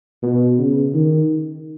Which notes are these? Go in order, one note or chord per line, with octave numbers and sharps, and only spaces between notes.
B2
C#3
D#3